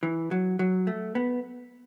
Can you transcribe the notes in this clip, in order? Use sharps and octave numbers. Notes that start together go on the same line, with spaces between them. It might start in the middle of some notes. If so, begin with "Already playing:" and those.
E3
F#3
F#3
A3
B3